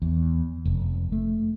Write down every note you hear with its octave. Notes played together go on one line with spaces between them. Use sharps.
E2
F1
A3